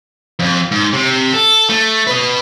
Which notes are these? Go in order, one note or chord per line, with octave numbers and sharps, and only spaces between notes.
F2
G#2
C3
A4
A3
B4 D#5